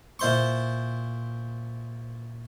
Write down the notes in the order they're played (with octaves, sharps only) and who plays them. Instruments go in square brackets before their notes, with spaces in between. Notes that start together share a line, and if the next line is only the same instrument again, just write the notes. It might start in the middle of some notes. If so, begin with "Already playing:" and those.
[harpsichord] A#2 E4 C5 C6 C#6